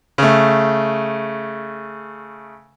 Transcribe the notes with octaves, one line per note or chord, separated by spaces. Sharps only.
C#3 A3